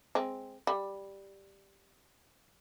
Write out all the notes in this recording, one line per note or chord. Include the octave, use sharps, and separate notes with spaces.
G#3 C4
G3